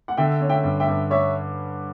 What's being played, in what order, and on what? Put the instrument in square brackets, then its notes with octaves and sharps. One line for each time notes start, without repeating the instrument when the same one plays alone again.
[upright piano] F#5
[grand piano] D3 [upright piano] E5 G5
[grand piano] C#4
[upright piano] E5 G5
[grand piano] G2
[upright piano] E5 G5
[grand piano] G2
[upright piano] C#5 E5